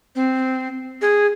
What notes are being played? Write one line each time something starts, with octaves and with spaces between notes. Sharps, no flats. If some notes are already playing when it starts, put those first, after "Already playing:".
C4
G#4